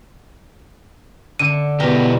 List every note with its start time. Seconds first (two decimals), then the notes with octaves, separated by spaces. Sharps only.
1.39 D3 D#7
1.80 E2 B2 B3 G4 A#4